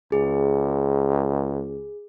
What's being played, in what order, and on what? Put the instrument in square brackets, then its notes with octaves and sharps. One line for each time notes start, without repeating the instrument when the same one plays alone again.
[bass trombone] C#2 [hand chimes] G#4